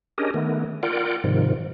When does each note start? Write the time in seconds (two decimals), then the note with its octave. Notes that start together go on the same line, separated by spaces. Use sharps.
0.18 C#4 D4 G4 G#4 A#4 D#5
0.34 D#3 A3 B3
0.83 F4 A#4 D5 F#5 G5
1.24 G#2 C3 D#3 F3